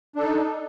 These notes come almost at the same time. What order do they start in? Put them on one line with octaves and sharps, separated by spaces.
D4 A4 D#4